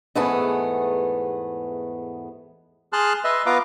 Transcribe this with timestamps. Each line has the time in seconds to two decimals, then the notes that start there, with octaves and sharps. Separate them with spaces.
0.15 E2 G#2 A3 B3 G#4 A5
2.93 G#4 A5 C6 F6 F#6
3.24 B4 D#5 E5 C6
3.46 B3 F4 B4 F5 A#5 D6